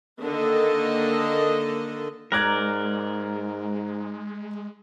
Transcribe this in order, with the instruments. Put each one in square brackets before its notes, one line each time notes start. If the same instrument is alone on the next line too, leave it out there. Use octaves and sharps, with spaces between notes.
[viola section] D3 D#3 A#3 A4 D#5
[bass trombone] G#2 [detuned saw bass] G#3 [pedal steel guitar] A#4 D5 [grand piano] A#5 F#6 G#6